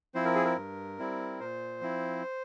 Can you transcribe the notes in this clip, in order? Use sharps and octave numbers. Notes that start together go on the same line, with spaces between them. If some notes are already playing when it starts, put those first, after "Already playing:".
F3 C4 E4 C5
A#4
G#4
A#4
G2
G3 C4 E4
A#2 C5
F3 C4 E4